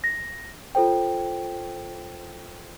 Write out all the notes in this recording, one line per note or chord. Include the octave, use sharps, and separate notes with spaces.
A#6
F4 A4 C5 G5